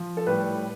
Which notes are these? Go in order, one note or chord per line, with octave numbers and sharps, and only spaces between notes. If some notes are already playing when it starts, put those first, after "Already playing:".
Already playing: F3
A4
A2 G3 B4